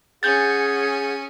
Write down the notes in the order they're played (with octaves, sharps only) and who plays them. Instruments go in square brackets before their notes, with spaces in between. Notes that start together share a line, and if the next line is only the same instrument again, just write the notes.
[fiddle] C#4 [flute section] G#4 F#5 [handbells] G6 A6